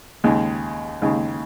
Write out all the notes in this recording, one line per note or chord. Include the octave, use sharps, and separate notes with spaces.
D#2 C#3 G#3
D#2 C#3 G#3